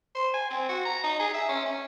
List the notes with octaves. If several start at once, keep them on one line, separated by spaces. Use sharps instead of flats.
C5
G#5
C4
F#4
A#5
D#4
G#4
E5
C#4
C#4